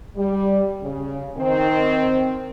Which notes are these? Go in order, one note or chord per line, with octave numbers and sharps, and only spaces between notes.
G3
C#3
D#3 C4